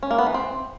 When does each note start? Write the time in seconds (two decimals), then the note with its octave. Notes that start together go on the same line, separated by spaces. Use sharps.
0.03 C#4
0.11 A#3
0.18 B3
0.26 E3
0.34 C4